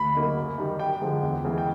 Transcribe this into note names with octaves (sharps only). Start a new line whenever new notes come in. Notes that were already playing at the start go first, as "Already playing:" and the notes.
Already playing: D2 B5
C#3 F#3 A#3 D#4
F#2
D#3 G3
F#2 G5
D3 F3 G#3
E2
C#3 E3 G#3
G5